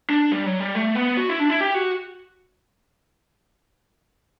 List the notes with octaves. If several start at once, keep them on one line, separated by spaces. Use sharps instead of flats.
D4
G3
F#3
G3
A3
B3
F#4
E4
D4
E4
G4
F#4